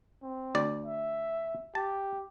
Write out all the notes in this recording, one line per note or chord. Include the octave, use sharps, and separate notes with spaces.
C4
D2 D5
E5
G4 A5